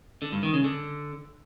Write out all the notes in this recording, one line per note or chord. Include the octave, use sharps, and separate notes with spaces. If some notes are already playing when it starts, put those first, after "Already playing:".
D3
G2
D#3
C#3
D3